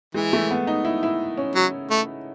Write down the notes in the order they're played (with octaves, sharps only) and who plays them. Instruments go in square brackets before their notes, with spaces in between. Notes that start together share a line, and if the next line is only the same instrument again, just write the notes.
[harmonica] E3 [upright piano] G#3
[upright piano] A3
B3
D#4
E4
E4
C#4
[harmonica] F#3
A3